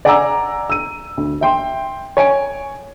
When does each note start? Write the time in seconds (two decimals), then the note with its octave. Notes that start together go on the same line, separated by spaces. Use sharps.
0.05 D5 F#5 G#5 A#5 D6 E6
0.70 E6 D#7
1.17 D2
1.41 E5 G5 C6
2.17 C#5 G#5 D7